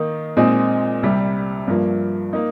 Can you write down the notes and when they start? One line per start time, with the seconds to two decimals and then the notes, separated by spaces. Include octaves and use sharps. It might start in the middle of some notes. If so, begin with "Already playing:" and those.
Already playing: D#3 A#3 D#4
0.37 A#2 G#3 C4 D#4
1.03 C2 C3 G3
1.67 G2 F3 A#3
2.33 A#3 D#4